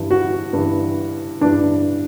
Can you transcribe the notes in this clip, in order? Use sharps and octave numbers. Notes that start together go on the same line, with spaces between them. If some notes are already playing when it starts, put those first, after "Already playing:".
Already playing: G2 E3
F#4
G2 E3
G2 E3 D4